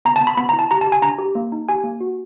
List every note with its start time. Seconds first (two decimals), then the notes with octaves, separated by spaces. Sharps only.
0.05 B3 A#5
0.16 A5
0.21 B3
0.27 B5
0.37 B3 B5
0.49 E4 A#5
0.59 A5
0.71 G4 A#5
0.81 A5
0.87 G4
0.92 G#5
1.02 D4 A#5
1.18 G4
1.35 A#3
1.52 D#4
1.69 G4 G#5
1.84 A#3
2.01 F#4